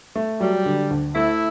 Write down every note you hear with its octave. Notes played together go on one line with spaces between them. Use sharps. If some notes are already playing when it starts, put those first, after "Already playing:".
A3
F#3 G3
D3
D2
A3 E4